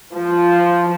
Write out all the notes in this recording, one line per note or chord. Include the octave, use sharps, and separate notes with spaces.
F3